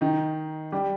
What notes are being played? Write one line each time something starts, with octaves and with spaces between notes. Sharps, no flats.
D#3 D#4
G3 G4